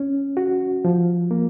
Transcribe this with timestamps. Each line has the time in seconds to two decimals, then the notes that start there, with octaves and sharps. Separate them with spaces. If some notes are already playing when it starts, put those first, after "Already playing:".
Already playing: C#4
0.37 F#4
0.85 F3
1.31 A#3